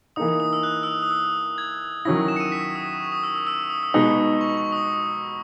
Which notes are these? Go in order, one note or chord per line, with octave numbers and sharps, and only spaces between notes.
E3 A#3 D#4 D#6
D#6
D#6
E6
F#6
E6
D#6
D#6
E6
G#6
D#3 F#3 C#4 E4 A#6
E7
C#7
D#7
B6
D#6
C#6
D#6
E6
E6
E6
D#6
E6
B2 G#3 B3 D#4 D#6
C#6
C#6
D#6